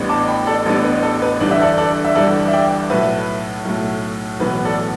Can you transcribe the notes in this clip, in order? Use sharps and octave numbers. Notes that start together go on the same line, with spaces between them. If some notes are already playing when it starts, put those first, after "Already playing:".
Already playing: A1 A2 G3 B3 D4
A5 D6
G5 B5
A4 D5
A1 A2 G3 B3 D4 A4
B4
A4
B4
G1 G2 E3 G3 D4 D5
E5
A4 D5
A4 D5
E5
G1 G2 E3 G3 D4 A4 D5
E5
D5 G5
B1 A2 A3 B4 E5
B1 A2 A3
B1 A2 E3 B3 B4
A4 D5